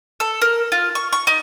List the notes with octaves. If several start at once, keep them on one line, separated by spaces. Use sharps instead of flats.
A4
A#4
F4
C#6
C#6
D#4